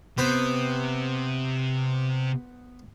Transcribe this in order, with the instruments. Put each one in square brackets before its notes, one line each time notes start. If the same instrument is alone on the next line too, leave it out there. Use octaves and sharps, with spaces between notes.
[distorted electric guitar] C3 [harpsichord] B3 B4 C5